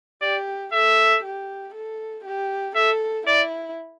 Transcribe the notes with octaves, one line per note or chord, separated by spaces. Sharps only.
G4 D5
A4 E5
G4
A4
G4
A4 E5
E4 D5